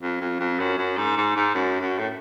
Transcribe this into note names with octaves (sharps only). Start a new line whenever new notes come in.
F2
F2
F2
F#2
F#2
G#2
G#2
G#2
F#2
F#2
A2